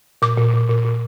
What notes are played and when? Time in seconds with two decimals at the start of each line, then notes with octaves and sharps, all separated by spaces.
0.22 A#2 D6
0.38 A#2
0.54 A#2
0.69 A#2
0.85 A#2